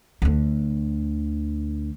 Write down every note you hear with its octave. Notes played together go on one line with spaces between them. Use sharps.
D2 D3